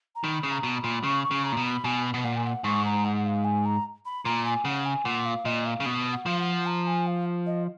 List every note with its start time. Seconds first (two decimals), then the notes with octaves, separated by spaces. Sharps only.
0.15 A#5
0.23 D#3 B5
0.43 C#3
0.50 A#5
0.63 B2
0.77 B5
0.84 A#2
1.03 C#3 C#6
1.24 C#6
1.31 C#3
1.43 A#5
1.52 A#2
1.57 B2
1.64 B5
1.84 B2 G#5
2.14 B2
2.24 A#2 F#5
2.36 G#5
2.44 F#5
2.64 G#2 C#6
2.84 A#5
3.04 F#5
3.25 F5
3.44 G#5
3.65 A#5
4.05 B5
4.25 A#2 A#5
4.45 G#5
4.65 C#3 F#5
4.85 G#5
5.05 A#2 F#5
5.25 F5
5.45 A#2 D#5
5.66 F5
5.80 C#3
5.86 B2
6.12 F#5
6.26 F3 F5
6.39 F#5
6.66 A#5
6.86 G#5
7.06 F5
7.46 D#5